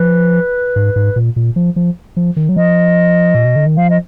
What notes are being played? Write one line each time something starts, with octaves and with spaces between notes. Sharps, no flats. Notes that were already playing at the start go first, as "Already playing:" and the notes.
Already playing: F3 B4
G#2
G#2
A#2
A#2
F3
F3
F3
D#3
F#3
F3 D#5
A#2
B2
D3
D#3
F3 F5
D#5